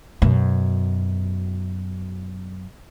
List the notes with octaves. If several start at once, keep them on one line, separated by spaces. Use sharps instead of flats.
F#2 B2